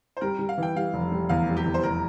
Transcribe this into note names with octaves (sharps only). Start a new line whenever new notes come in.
C5
G3 A#4
G3
F5
E3
G5
G3 F5
F1
G3
E2 F5
G3
G4
E2
C5
F1 A#4